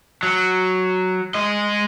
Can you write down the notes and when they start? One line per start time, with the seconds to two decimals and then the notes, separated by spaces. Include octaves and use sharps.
0.23 F#3
1.34 G#3 D#5